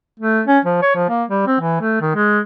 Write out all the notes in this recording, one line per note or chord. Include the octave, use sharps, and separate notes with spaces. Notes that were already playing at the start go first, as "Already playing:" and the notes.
A3
C#4
F3
C#5
F3
A#3
G3
C4
E3
A3
D#3
G#3